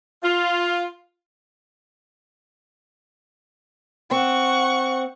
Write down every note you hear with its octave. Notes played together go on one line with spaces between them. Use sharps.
F4
C4 F#5 C#6